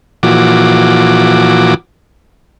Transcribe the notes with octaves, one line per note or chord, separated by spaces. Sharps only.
A#2 E3 F3 F#4 D6